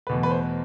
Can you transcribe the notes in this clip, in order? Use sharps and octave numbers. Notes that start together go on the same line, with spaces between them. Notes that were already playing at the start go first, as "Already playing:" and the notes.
E2 B2 A3 B4
B4
C5